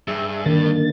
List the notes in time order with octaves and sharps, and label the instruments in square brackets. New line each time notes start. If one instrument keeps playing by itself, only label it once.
[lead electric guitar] G2 [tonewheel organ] G#4 E5
[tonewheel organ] D3 A#3 A6 [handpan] D#3